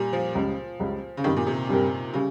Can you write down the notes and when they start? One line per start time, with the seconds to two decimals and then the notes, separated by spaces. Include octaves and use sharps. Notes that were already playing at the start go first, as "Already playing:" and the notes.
Already playing: A#2 G3
0.13 F3
0.35 C#2 C#3 G3
0.79 C#2 C#3 G3
1.17 C#3
1.24 G2 D#3 G3 C4 G4 A#4
1.36 A#2
1.47 C3
1.69 G2 G3 C4 G4 A#4
2.13 C#3 G3